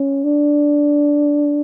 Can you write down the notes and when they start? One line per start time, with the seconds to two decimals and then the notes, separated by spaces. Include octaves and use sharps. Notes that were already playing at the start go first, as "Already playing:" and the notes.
Already playing: C#4
0.24 D4